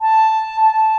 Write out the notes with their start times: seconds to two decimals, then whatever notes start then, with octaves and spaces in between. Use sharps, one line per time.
0.01 A5
0.61 A5